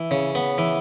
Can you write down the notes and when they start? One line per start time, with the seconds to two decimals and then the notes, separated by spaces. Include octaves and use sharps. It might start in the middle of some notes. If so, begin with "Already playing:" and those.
Already playing: E3
0.11 C#3
0.35 B3
0.58 E3